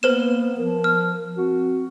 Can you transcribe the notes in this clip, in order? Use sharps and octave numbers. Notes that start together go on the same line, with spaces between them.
A#3 B3 B4 C5 E7
F3 A#4
F6
C4 F#4